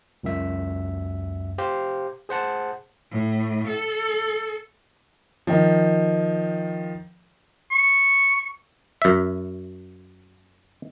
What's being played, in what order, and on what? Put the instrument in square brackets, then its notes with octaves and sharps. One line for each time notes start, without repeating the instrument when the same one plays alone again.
[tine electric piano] C#2 F#2 E5
G4 C5 F5
G#4 C5 F#5 A5
[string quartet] A2
A4
[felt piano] D#3 F3
[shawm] C#6
[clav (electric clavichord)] F#2 E5